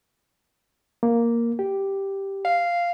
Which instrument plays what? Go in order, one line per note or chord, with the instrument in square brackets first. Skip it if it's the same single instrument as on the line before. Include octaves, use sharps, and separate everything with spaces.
[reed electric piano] A#3
G4
[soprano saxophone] F5